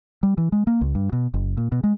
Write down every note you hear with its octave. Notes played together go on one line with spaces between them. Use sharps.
G3
E3
G#3
A#3
C#2
G2
B2
F#1
A#2
B2
G#3